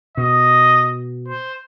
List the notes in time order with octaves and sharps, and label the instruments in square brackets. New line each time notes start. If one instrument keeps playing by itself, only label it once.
[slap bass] B2 [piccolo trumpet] D#5
[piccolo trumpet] C5